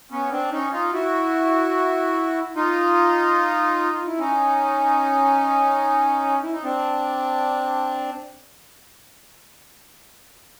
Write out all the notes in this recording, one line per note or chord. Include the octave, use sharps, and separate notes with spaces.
B3 C#4
C4 D4
C#4 D#4
D#4 F4
E4 F#4
D#4 F4
F4
E4
C#4 D#4
E4
D#4
C4 D4